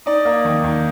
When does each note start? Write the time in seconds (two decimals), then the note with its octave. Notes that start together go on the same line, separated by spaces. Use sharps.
0.06 D#4 D5
0.25 A#3
0.45 D#3
0.64 D#3